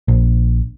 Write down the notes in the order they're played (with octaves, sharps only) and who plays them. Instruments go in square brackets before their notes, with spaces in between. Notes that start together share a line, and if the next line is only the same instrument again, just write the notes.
[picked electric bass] A#1